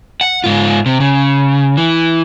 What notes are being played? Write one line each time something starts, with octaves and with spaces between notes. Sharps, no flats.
F#5
G#2 F4
C3
C#3
E3